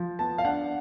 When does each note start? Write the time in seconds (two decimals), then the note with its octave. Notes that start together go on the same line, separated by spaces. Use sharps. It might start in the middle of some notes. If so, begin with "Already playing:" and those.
Already playing: F3
0.19 B3 A5
0.38 F5
0.45 D4 F#5